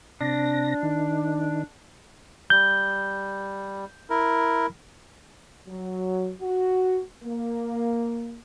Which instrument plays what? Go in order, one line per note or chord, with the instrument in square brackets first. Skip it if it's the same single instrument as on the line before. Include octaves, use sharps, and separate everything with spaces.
[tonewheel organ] C3 A#6 [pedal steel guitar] D4
[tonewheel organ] D#3
[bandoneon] G3 [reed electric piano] G6
[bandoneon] E4 A#4
[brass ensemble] F#3
F#4
A#3